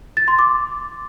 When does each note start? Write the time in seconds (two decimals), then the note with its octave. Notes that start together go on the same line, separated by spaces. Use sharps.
0.17 A6
0.28 C6
0.39 D6